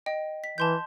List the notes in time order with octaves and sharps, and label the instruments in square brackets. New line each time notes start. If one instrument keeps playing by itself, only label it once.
[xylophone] D#5 G5
B6
[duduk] E3 [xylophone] A5 C6 G6